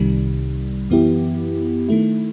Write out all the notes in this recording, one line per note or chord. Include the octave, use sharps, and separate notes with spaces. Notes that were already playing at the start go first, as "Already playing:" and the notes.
Already playing: C2 C3 D#3 G3
F#2 E3 B3 E4 G4
D#3 A3 E4